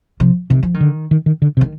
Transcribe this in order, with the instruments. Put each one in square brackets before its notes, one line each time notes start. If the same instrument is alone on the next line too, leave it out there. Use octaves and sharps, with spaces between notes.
[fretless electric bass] C3 [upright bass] F3
[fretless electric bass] C3 [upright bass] D#3
[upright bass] F3
D#3
[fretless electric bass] D3
D#3
D#3
D3
C3
[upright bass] D#3